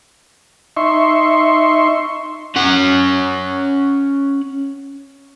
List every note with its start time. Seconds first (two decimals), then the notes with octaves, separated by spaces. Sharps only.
0.77 D#4 E5 C6 C#6
2.56 C#4 F#5